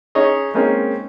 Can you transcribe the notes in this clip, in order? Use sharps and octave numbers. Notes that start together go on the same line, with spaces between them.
C#4 D#4 G#4 C#5 D#5
G#3 A#3 C4 C#4 D#4